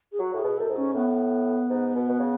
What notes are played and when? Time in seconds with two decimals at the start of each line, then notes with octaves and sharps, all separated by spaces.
0.12 G#4
0.19 F#3 F#4
0.34 A2 G#4
0.44 B2
0.57 F#2 A4
0.69 G#2
0.76 C#4
0.94 A2 B3
1.70 G#2
1.95 B2
2.09 B2
2.19 C#3